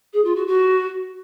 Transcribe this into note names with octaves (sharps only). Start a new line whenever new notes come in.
G#4
F4
F#4
F#4